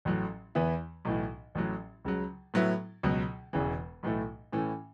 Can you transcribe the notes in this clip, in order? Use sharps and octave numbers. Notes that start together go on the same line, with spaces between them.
A1 A2 F#3
E2 E3 B3 E4
B1 A2 E3
A1 A2 F#3
C#2 C#3 F#3
A2 F#3 B3 E4
C#2 B2 F#3
E1 E2 C#3 E3
B1 A2 E3 A3
A2 E3 A3 C#4